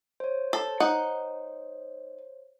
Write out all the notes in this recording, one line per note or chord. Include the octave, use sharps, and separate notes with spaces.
C5 C#5
A4
D#4 F#5